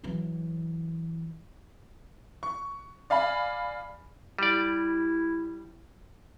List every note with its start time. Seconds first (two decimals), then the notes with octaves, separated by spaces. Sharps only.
0.04 E3 F#3
2.43 C#6
3.10 D5 F5 G#5 B5
4.39 G3 E4 D5